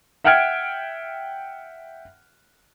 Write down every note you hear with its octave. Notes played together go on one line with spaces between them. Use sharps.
E5 F#5 G5 F6 G#6 D7